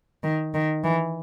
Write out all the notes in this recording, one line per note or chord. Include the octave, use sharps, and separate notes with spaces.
D#3
D#3
E3